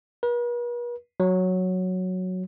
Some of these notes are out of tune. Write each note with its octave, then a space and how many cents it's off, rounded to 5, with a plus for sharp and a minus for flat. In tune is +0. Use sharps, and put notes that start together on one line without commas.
B4 -45
F#3 -5